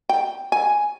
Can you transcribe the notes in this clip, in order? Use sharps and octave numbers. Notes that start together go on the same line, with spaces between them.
G5
G#5